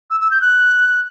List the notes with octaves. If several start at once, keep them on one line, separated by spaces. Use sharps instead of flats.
E6
E6
G6
F#6